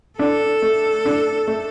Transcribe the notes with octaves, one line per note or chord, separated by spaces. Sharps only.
D4 A4
A3
D4
A3